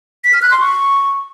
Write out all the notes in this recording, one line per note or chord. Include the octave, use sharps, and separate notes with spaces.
B6
F6
F#6
C6
C#6